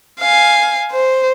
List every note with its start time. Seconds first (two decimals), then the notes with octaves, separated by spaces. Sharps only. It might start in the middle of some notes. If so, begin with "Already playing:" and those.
0.20 F5 G#5
0.91 C5